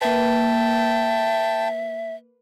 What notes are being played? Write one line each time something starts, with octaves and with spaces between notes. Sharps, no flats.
A#3 B4 E5 G5 A5